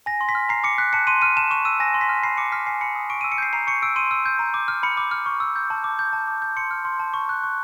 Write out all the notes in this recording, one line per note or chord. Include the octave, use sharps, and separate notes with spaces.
G#5 A#6
C6
B6
F6
A#5 C7
D6 C#7
F#6 B6
A5 C#7
C6 D#7
F6 D#7
A5 E7
C#6 E7
E6 D#7
G#5 A#6
C6
B6
F6
B5 C7
D6 C#7
F6 B6
G#5 C7
B5 C#7
D#6
C#6 D7
D#7
E6
C#7
G6 C7
A#5 C7
C#6 C#7
E6 D7
C6 D#7
E6
G6
A#5
D6
F6
B5 C#7
D6
F6
C#6
E6
G6
A5
D6
G6
A5
D6
G6
C6 C#7
F6
C6
A5
C#6
F#6
C#6